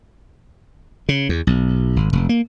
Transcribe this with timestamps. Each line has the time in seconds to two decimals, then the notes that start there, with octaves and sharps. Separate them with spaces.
1.09 C#3
1.29 E2
1.47 B1
1.96 G#1
2.13 F1
2.29 A#3